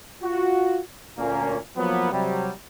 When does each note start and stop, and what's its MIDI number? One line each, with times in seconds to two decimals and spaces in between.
0.23 0.81 65
0.23 0.81 66
1.18 1.56 38
1.18 1.56 46
1.18 1.56 58
1.18 1.56 61
1.77 2.10 53
1.77 2.10 54
1.77 2.10 58
1.77 2.10 59
2.12 2.51 48
2.12 2.51 54
2.12 2.51 55